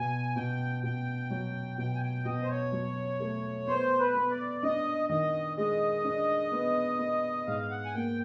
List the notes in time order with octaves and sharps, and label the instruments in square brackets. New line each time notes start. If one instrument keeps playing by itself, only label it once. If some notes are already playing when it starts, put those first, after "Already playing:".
Already playing: [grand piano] B2 [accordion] G#5
[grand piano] B2 [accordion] G5
[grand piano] B2 [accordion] G5
[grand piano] F#3
[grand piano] B2 [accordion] G5
[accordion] G#5
G5
[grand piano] B2 [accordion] D#5
[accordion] C5
C#5
[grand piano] F#3
A3
[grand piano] B3 [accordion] C5
[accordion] B4
[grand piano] B3
[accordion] D5
[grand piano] D4 [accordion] D#5
[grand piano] D#3 [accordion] D#5
[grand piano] G#3 [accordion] D#5
[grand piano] D4
B3
B3
[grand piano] G#2 [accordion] F5
[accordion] F#5
G#5
[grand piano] A#3 [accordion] G5